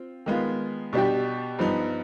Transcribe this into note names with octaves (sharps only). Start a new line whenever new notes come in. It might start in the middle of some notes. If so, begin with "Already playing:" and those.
Already playing: C4 F4
D#3 G#3 B3 F4
B2 G3 D4 G4
G2 F3 B3 D#4